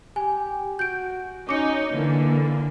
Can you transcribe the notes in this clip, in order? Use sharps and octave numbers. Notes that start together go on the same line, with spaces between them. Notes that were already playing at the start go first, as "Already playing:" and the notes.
G4 G#5
F#4 G6 D7
C#4 D#4 D6 C#7
D3 E3 A#3